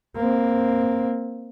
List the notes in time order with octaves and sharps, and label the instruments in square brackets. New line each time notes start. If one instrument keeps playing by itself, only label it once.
[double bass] A#3 C4